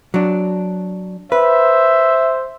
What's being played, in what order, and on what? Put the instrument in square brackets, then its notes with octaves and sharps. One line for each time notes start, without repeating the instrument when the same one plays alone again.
[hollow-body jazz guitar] F#3 D4
[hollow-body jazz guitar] B4 [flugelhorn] C5 [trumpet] E5